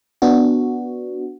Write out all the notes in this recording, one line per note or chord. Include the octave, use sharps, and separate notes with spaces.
B3 D4 F#4